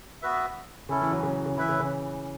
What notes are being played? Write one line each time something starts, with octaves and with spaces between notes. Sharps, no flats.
B3 F#4 B4 E5
C#3 C#4 E4 A4
E3
F#3
C#3
C#3
E3 E4 B4 E5
C#3
C#3